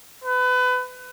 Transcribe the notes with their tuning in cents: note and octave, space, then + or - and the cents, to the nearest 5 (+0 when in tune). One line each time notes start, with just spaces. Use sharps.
B4 +25